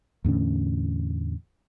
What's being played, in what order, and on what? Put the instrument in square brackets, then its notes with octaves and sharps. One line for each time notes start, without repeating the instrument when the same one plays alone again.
[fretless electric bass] E2 A2 D3 C#4